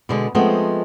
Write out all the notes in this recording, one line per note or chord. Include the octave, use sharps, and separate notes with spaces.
B2 D3 G#3
F3 G#3 A3 B3 C4 C5